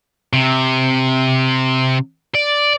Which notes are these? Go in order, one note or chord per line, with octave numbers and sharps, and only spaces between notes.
C3
D5